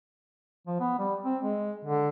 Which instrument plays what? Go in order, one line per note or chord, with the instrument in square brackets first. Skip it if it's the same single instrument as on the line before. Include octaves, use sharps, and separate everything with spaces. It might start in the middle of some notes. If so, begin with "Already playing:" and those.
[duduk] F3
B3
G3
C4
G#3
D3